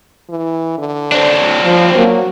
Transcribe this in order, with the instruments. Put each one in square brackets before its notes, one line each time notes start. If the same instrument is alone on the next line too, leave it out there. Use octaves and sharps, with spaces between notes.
[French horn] E3
D3
[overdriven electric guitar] C4 D4
[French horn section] F3
[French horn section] F#3 A#3 [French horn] F#4